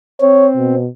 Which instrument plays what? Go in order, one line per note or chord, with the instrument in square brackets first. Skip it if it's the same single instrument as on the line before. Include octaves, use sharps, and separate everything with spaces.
[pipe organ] C4 [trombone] C#5
[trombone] B2